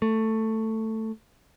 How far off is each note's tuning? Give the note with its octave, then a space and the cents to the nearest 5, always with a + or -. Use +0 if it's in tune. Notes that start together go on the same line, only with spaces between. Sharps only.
A3 +10